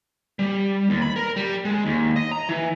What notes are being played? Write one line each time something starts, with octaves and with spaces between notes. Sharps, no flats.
G3
D#2
B5
A#4
G3
G#3
D#2
D#5
A#5
E3